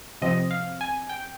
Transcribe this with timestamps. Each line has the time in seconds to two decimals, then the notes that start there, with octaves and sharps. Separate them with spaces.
0.22 C3 F3 C4 D#5
0.51 F5
0.81 G#5
1.09 G5